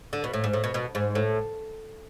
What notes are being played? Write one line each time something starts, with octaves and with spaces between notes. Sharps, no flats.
D3
B2
A2
G#2
A2
B2
B2
G#2
A2